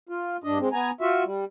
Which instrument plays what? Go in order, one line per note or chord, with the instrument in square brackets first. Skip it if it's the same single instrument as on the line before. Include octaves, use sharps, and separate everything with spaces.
[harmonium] F4
G2 D4 D#5
G#3 C4
B3 G#5 A#5
F4 F#4 E5
G3